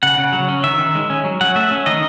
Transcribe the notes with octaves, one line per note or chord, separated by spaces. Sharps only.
C#3 F#5
C#3
F#3
C#4
D#3 E5
D#3
G#3
C#4
F#3
F#3 F#5
A3 E5
C#4
D#3 D#5